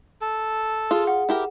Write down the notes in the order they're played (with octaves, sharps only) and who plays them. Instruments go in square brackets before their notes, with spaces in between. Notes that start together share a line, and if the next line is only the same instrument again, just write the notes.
[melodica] A4
[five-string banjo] F4 [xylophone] G#4
[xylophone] F#5
[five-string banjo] E4 G4 A#4